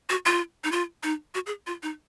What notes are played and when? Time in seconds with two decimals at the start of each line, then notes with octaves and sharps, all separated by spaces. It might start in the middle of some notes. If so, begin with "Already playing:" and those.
0.09 F#4
0.26 F4
0.64 D#4
0.72 F4
1.03 D#4
1.35 F#4
1.46 G#4
1.67 F4
1.83 D#4